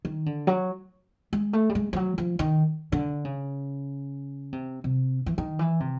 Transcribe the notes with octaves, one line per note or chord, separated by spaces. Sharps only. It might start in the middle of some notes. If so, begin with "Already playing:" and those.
D#3
D3
F#3
G#3
A3
G3
G#3
F3
F#3
F3
D#3
D3
C#3
C3
C3
E3
D#3
E3
C3